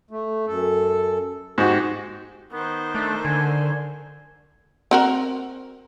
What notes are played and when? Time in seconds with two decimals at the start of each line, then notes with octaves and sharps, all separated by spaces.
0.11 A3
0.47 F#2 A4
1.58 G#2 F#4 G4
2.52 D#3 B3 C5
2.95 A3 D4
3.25 D3 G#5
4.91 C4 F#4 A#4